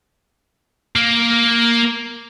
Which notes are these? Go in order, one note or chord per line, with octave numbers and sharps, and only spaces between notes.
A#3